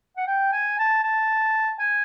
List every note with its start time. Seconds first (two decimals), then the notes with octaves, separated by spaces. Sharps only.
0.17 F#5
0.27 G5
0.53 G#5
0.79 A5
1.03 A5
1.79 G#5